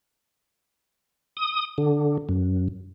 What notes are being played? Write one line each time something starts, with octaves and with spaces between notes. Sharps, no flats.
D#6
D3
F#2